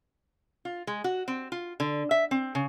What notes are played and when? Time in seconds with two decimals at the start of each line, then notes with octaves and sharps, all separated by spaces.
0.65 F4
0.87 G#3
1.04 F#4
1.28 C4
1.52 F4
1.80 D3
2.11 E5
2.31 C4
2.55 C#3